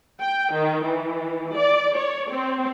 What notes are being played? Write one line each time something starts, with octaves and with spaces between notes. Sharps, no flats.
G5
D#3
E3
D5
C#5
C4